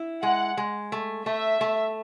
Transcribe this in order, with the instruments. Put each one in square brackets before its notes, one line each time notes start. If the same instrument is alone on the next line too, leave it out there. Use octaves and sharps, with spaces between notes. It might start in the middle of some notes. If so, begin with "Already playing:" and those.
Already playing: [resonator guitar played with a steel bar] E4
[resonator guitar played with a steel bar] G#3 [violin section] F#5
[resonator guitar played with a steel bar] G#3
A3
[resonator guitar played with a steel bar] A3 [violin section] E5
[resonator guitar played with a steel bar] A3